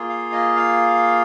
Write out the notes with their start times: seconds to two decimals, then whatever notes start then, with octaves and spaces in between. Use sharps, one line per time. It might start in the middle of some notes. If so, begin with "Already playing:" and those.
Already playing: A#3 F4 G#4
0.09 F5
0.32 D#5
0.56 F5